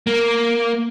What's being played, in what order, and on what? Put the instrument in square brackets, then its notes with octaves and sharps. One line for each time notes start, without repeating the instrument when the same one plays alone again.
[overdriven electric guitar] A#3